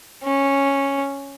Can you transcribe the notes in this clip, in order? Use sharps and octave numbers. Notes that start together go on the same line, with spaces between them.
C#4